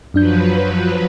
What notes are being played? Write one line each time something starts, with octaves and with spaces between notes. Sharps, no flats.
F#2 F3 F#3 D4 B4 G6